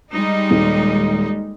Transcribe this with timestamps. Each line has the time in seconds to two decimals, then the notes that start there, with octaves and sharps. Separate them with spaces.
0.11 G3 G#3 D#4
0.51 D#1